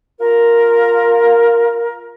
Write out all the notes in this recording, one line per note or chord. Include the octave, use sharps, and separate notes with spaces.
F4 A#4